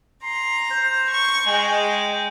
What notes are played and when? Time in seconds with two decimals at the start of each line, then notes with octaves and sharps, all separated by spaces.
0.23 A#5 C6
0.70 C5
1.11 C#6
1.48 G#3 G5